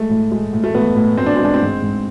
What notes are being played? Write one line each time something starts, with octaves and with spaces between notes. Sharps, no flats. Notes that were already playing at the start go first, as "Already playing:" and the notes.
Already playing: G#3 A3
A2
G#3
A2
A3
A2 B3
A2
A2 C4
D4
G#3 C4
D4
C4
G#2
G#2